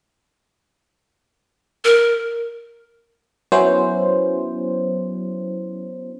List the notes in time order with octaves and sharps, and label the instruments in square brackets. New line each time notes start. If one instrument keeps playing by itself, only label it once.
[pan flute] A#4
[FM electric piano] F#3 B3 C#4 E4 C5